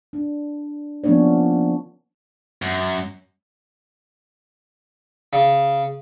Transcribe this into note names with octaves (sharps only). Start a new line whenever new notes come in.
D4
F3 A#3 B3 C#4 D4 C#5
F#2
C#3